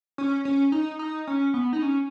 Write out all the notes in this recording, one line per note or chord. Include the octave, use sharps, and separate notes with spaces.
C#4
C#4
D#4
D#4
C#4
B3
D#4
C#4